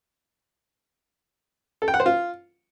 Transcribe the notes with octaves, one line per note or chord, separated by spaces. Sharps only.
A4
G5
F#5
C5
F4